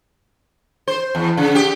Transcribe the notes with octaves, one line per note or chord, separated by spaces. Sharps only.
C5
E2
C#3
G4